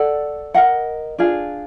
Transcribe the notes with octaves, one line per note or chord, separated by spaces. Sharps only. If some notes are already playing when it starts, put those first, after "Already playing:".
Already playing: A4 D5 F#5
A#4 D#5 F#5
D4 F4 G#4